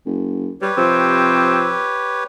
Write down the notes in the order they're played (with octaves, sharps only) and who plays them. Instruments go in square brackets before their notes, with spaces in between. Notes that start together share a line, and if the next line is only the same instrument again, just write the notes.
[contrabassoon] F#1
[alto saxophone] G3 [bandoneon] G4 B4 C#5
[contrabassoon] C3 [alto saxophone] F3 [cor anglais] C4